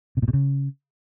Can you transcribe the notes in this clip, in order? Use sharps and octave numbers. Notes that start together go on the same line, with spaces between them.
C3
A#2
B2
C#3